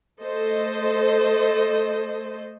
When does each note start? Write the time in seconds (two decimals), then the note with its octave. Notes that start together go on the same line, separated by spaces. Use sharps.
0.20 A3 A4 C5 D#5